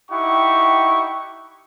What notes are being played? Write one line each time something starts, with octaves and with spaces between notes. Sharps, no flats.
D#4 E4 G4 F#5 G5 C#6